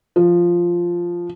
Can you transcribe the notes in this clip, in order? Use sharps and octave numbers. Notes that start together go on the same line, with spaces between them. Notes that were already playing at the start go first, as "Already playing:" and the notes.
F3